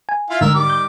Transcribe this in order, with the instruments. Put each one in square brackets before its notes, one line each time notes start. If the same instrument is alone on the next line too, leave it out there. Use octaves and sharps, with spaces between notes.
[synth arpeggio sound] G#5
[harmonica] E4 F4 F5
[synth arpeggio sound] G#2 D3 [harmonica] D#3 A#4 E6
[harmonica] D#3 G3 D6
[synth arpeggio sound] G6